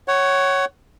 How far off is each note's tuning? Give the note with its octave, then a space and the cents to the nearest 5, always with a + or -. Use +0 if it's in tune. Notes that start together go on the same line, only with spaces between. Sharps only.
C#5 +0 F#5 +25